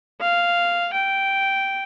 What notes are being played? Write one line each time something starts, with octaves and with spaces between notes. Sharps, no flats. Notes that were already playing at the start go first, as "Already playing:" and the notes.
F5
G5